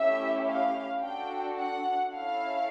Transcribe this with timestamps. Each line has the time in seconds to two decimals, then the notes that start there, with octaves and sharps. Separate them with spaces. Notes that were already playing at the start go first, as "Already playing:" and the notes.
Already playing: A3 C#4 E4 G4 E5
0.46 F5
1.02 D4 F#4 A4 G5
1.58 F#5
2.13 C#4 E4 A4 F5